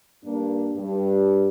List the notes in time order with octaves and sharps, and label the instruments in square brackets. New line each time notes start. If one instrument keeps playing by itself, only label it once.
[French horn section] G2 A#3 D4
G2